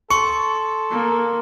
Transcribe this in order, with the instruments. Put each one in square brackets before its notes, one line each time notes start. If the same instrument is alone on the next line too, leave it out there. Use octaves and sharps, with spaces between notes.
[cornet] A4 [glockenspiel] C6 C#7 [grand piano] C#6
[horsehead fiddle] A#3